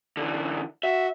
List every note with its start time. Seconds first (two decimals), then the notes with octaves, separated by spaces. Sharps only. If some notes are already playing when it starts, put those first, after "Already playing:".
0.17 D3 E3
0.83 F#4 E5